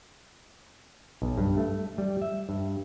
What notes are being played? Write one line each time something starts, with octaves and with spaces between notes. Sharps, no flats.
B1
G2
A3
G3
E5
G2